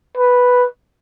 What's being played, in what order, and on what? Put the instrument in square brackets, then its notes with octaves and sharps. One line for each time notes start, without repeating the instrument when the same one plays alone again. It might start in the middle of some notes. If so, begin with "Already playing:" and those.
[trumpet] B4